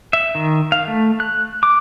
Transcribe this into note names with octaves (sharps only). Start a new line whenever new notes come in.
E5
D#3
F5
A3
F#6
D6